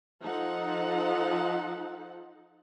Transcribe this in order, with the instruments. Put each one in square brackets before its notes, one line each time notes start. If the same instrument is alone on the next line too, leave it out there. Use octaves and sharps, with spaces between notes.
[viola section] F3 D#4 A4 F#5